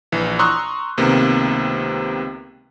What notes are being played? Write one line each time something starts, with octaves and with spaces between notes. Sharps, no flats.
A#1 E3
A#5 C6 C#6 D#6 E6 F#6
C#2 C3 D#3 A#3 B3